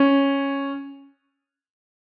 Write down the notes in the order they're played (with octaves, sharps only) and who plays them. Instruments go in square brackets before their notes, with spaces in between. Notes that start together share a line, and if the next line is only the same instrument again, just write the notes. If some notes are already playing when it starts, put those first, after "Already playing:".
Already playing: [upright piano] C#4